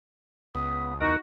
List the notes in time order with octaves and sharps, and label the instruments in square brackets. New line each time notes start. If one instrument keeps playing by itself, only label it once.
[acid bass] C#2 [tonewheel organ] B3 [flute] D#6
[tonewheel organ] E2 A#4 [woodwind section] D#4 F#4